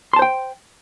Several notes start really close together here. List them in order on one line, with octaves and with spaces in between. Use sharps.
C6 A5 C5 G5